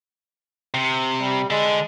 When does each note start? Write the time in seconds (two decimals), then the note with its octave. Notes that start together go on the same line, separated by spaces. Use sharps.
0.74 C3
1.21 G3
1.51 D3 G#3 D4